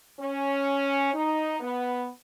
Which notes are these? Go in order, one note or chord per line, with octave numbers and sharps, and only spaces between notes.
C#4
D#4
B3